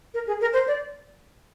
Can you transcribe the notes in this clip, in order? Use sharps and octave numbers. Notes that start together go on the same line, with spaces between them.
A#4
G#4
A#4
C5
D5